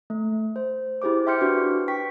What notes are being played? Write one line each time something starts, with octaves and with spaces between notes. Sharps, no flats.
A3
C5
E4 G4 G#4 C5 D6
E5 G5 C6 F6 G6 C#7
D4 F#4 G4 B4
G5 C#6 B6